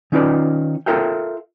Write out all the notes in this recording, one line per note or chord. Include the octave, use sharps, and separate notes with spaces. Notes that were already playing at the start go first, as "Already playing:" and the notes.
D#3 C#4 D#4 F4 B4 D5
F4 A4 A#4 E5 F5 G5